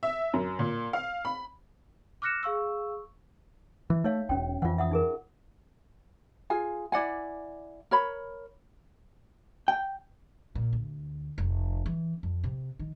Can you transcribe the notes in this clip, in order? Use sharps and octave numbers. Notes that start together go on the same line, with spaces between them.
E5
F#2
A#2
F5
B5
D6 F6 F#6 A#6 C#7 E7
G#4 F5 C#6 E6
E3 E5
A3 D#4 C#5 F5
E1 C2 C#4 G5
F2 E3 F4 F#5
E5 F#5 D#6
D#4 G#4 A#4
F4 G#4 G#5
E4 D5 F#5 G#5
A#4 C#5 B5
G5
A#2
D2
F1
E3
F2
C3
D#3